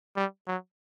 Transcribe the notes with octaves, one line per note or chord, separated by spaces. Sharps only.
G3
F#3